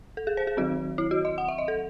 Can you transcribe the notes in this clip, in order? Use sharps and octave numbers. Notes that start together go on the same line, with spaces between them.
A4
G#4
C5
G#4
D#3 F#3 C4 F#4
E4
F#4
D#5
F#5
E5
D#5
A4